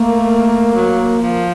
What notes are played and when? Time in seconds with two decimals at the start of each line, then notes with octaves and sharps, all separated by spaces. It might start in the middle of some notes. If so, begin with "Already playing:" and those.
Already playing: A3 A#3
0.75 F#3
1.21 F3